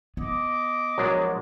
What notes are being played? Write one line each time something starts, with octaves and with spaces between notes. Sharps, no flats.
B3 D#5 D6
A#1 F#3 G#3 D4